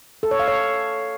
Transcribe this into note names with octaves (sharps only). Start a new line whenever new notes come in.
A4
C#5
F5
C#5